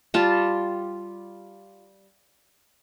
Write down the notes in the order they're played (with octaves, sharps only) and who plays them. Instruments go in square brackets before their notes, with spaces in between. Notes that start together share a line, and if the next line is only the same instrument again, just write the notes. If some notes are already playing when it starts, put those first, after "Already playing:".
[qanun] G3 F4 A5